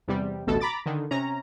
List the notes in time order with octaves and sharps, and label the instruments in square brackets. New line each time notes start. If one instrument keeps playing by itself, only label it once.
[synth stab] E2 C3 G3
A1 D2 B2 A4
A#5 B5 D6 A6
D3 D#3
C3 C#4 A#5